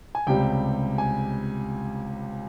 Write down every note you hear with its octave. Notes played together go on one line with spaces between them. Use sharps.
G#5
C#2 C3 G3 G5
G#5